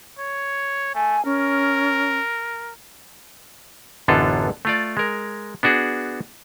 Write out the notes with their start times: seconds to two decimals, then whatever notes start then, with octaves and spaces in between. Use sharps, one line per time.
0.19 C#5
0.95 A3 G#5
1.25 C#4 A#4
4.08 A1 F#2 D3 B3 F4 A4
4.65 A3 F4 D5
4.97 G#3 A#4
5.63 B3 D4 F#4 G#4